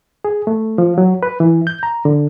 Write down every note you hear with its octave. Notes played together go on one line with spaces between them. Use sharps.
G#4
A3
F3
F#3
B4
E3
G6
A#5
D3